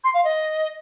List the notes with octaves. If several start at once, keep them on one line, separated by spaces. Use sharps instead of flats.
C6
F5
D#5